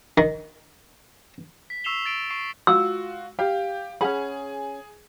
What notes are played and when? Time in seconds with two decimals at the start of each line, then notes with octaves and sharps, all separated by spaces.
0.18 D#3
1.70 B6
1.84 C#6 E6 C7 E7 F7 G7
2.06 A6 D7
2.30 C#6 C7
2.67 F4 F#4 E6
3.39 G4 F5
4.01 C#4 G#4 F#5 B5